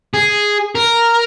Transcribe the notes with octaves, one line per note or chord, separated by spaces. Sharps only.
G#4
A#4